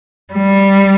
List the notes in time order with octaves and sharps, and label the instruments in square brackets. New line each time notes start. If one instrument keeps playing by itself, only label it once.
[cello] G3